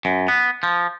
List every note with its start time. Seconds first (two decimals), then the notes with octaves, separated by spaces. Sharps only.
0.05 F#2
0.28 B3
0.63 F3